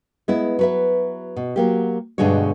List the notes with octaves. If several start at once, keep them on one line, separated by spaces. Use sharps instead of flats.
G#3 B3 E4
F#3 B4 E5
B2
F#3 A#3 G4
G2 B2 D3 G#3 D4 C#5